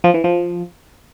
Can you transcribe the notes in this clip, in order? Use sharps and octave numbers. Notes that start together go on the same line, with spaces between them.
F3
E3
F3